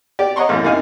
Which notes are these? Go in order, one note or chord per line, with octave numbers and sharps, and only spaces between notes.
G4 D5
C#5 D#5 F#5 A#5 C6 C#6
A1 F#2
F#2 C3 D#4 F5 G#5